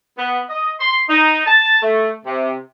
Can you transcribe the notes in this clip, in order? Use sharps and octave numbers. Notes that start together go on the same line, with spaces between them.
B3
D#5
C6
D#4
A5
A3
C3